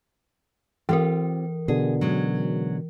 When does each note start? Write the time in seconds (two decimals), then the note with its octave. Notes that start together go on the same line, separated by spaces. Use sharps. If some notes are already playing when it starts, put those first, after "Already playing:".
0.89 E3 C4 F4 G4 A#4
1.68 B2 D3 G#4
2.01 F#3 G#3 C#4